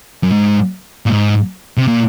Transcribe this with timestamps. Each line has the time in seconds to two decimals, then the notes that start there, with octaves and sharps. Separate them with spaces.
0.23 F#2
0.32 G#2
1.06 A#2
1.10 G#2
1.77 C3
1.87 A#2